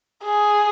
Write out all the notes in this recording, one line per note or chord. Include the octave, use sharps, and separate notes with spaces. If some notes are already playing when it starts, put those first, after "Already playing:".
G#4